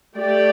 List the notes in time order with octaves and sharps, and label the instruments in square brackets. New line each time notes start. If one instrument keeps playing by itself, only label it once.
[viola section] A3 G4 D5